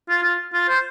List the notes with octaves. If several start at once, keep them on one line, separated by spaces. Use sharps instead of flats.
F4
F4
F4
C5